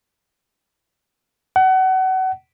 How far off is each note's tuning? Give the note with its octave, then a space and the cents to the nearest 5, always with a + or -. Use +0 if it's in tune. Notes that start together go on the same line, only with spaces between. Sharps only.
F#5 +30